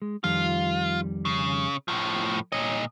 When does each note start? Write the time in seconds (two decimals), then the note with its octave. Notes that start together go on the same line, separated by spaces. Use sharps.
0.02 G#3
0.24 F2 D#3 G3 F4
1.25 C#3
1.88 A2 F3
2.52 A#2 C#5 D#5